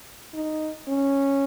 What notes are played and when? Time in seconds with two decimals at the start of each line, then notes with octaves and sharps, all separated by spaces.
0.34 D#4
0.88 C#4